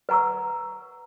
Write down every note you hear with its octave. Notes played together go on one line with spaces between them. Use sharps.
B4 F#5 A#5 C#6 E6